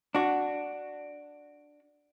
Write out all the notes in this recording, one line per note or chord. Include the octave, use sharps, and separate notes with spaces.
D4 F#4